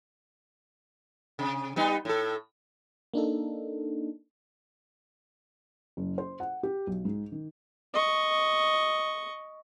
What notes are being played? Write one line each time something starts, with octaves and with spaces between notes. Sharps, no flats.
C3
G3 B3 D#4
A2 A4
A#3 D4 D#4 A4
F#1
C5
F#5
G4
B1
G#2
D#3
D#5 C#6